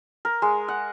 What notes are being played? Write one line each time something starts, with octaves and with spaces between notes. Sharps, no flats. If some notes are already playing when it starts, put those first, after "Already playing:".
A#4
G#3
F#5